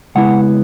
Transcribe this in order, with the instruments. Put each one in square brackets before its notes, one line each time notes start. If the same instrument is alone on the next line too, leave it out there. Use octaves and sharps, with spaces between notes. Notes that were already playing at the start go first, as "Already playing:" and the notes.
[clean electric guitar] C#3 G#3 B3 E4 F#5